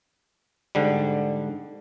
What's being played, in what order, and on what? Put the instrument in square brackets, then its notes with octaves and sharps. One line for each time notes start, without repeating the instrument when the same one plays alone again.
[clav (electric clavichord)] G#2 D3 G3